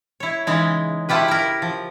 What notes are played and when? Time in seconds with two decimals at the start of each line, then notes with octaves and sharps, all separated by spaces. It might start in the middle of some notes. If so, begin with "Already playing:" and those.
0.20 E4 C#5
0.47 C#3 E3 G#3 D#4
1.09 A3 E4 F4 G4 B4
1.28 E4 A#4
1.62 F3